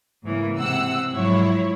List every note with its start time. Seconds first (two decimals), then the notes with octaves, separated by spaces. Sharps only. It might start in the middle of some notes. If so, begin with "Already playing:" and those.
0.24 G#2 C#3 E3 A#3
0.58 C3 F#5 E6
1.11 G#2 F3 F#3 E4 C#5